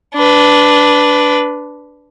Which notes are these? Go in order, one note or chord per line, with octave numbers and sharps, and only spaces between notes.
D4 B4